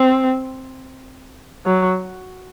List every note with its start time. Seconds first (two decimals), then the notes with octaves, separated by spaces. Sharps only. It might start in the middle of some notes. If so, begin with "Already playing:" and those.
Already playing: C4
1.66 F#3